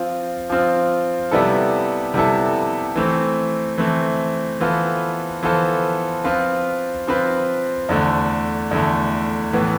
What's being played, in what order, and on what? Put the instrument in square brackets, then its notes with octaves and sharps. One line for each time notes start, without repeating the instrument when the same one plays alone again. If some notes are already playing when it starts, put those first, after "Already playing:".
Already playing: [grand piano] F3 C4 F4
F3 C4 F4
C3 G3 B3 E4 A4
C3 G3 B3 E4 A4
E3 A3 C4
E3 A3 C4
E3 B3 F4 A4 C5
E3 B3 F4 A4 C5
F3 C4 F4 B4
F3 C4 F4 B4
E2 D3 A3
E2 D3 A3
A2 E3 B3